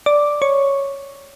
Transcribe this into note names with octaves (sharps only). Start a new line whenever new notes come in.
D5 D6
C#5 C#6